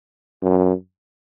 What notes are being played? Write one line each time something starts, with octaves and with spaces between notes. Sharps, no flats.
F#2